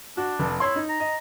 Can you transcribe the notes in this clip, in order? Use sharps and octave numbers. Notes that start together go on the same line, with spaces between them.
D4 F#4
F1
E4 C#5 C6
D#4
A#5
D#5